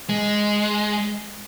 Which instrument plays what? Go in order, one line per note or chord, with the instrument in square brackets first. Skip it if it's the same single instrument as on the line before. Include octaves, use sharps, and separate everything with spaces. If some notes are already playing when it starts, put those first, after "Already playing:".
[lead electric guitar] G#3